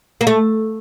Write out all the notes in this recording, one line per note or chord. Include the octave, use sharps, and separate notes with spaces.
A#3
A3